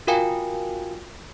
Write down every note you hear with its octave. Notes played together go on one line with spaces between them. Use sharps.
F4 F#4 A#4 F5 G5 G#5